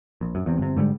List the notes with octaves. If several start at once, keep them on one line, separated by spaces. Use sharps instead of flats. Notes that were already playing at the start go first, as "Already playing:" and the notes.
A#1
F#2
E2 C3
G1 C3
G#2 D3 F#3 G3